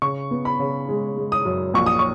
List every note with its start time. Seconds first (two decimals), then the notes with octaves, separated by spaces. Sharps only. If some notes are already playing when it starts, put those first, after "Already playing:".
0.02 C#3 C#6
0.31 B3
0.45 B5
0.59 C#3
0.89 G#3
1.16 G#3
1.32 D#6
1.45 F#2
1.74 A#1 C#6
1.86 D#6
1.99 C#6